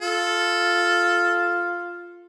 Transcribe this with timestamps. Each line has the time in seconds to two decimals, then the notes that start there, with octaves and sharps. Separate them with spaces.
0.02 F4 A4